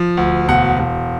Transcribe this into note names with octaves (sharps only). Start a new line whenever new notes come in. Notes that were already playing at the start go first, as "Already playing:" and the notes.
Already playing: F3
D2
E1 F#5
E1